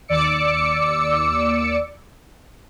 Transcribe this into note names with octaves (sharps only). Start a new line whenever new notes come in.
D#2 D5 D6 E6 C#7